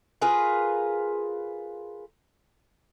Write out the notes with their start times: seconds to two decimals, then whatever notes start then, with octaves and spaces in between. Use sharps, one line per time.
0.22 F4 G#4 A#4 B4